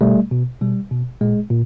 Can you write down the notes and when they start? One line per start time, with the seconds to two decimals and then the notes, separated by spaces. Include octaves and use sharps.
0.01 B2 G3 A3
0.31 B2
0.61 B2 G3
0.91 B2
1.21 A#2 G#3
1.50 A#2